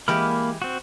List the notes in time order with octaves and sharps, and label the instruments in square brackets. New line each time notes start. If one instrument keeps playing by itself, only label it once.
[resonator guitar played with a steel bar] E3 G#3 G4 [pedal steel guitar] A#3 B5 F6
[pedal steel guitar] C4 F#4